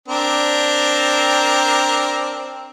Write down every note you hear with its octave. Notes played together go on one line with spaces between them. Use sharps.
C4 D4 A#4